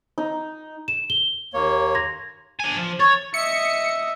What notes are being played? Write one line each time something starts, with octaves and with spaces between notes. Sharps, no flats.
D#4
E7
G7
D#2 A#3 C#5
C6 G#6 A#6
D4 G#5
F3
C#5 C#6 G#6 A6
D#5 E5 C#7